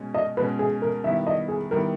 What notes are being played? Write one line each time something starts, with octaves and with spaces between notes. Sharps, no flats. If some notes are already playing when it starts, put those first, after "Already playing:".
Already playing: B2 G#3 C#4
D#5
B2 G#3 C#4 B4
G#4
A#4
D#3 G3 B3 E4 E5
D#5
G#4
D#3 G3 B3 E4 A#4